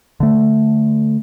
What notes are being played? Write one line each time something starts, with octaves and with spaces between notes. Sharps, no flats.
D3 A3